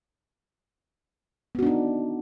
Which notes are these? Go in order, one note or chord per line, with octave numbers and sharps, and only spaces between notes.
B3 D4 D#4 F#4